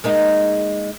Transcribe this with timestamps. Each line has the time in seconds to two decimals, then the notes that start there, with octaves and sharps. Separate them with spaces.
0.04 G#3 A#3 D#4